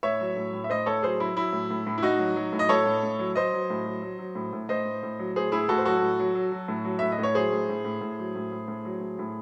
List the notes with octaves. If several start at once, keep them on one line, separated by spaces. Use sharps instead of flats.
A2 C#5 E5
F#3
A2
A2
E5
A2 C5 D#5
A2 A4 C#5
F#3 G#4 C5
F#3 E4
F#3 E4
A2
A2
A2
E4
A2 D#4 F#4
F#3
F#3
A2
D#5
A2 A4 C#5
A2
A2
F#3
F#3 C5 D#5
F#3
A2
F#3
F#3
F#3
A2
A2
A2 C5 D#5
A2
A2
F#3
A2 G#4 C5
A2 E4 G#4
A2 F#4 A4
C5
F#3 F#4 A4
A2
F#3
F#3
F#3
A2
F#3
A2 E5
D#5
A2
C#5
F#3 G#4 C5
A2
A2
A2
A2
F#3
A2
A2
A2
F#3
A2
A2